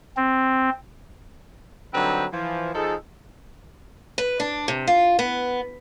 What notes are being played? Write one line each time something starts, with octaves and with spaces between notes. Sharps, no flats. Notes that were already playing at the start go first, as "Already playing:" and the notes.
C4
G2 D3 F#3 C4 D#4 B4
E3 F3
F3 D#4 G#4 A4
B4
D4
C3
F4
B3